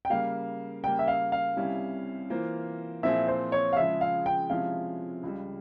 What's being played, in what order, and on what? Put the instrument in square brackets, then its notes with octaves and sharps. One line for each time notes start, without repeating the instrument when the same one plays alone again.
[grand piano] G5
[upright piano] C#3 G3 A#3 [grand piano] F5
[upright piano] C#3 G3 A#3 [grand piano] G5
[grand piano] E5
F5
F5
[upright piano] C2 C3 G3 C#4 E4
E3 A#3 F4 C5
[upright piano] A#2 F3 C4 E4 G#4 [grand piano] E5
[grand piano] C5
C#5
F5
[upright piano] C#3 F3 G#3 [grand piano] E5
[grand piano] F5
G5
[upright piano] C3 F3 G#3 C#4 E4 [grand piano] F5
[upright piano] C#2 C#3 G3